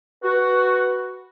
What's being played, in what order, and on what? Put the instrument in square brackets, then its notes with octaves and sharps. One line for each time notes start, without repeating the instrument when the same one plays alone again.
[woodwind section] F#4 [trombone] B4